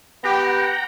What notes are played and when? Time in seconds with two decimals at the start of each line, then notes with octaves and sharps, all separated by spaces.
0.24 B3 G4 F#5 G5 A#5